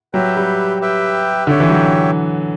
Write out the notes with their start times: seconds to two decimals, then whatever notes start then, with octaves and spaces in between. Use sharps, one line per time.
0.13 F#3 G4 B4 E5 G5
0.37 G3
0.81 G4 B4 E5 G5
1.47 D3 G4 C#5 E5 G5
1.60 E3
1.69 F#3